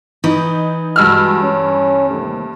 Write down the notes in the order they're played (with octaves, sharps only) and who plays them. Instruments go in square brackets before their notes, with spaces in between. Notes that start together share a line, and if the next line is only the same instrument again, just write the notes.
[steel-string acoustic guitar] E3 [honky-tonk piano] D#4
[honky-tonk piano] G2 E6 F6 [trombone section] G#3 F#4
[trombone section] C#4
D#2 C3 A3